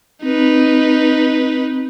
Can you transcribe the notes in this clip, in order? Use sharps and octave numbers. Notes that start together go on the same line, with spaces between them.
C4 D#4 B4